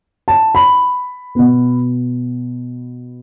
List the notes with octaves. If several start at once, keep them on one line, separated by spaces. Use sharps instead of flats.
A5
B5
B2 B3